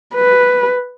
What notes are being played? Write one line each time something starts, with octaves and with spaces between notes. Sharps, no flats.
B4